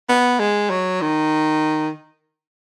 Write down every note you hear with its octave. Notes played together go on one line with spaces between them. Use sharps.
B3
G#3
F#3
D#3